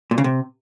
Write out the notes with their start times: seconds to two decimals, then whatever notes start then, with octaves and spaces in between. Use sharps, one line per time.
0.11 A#2
0.18 C#3
0.24 C3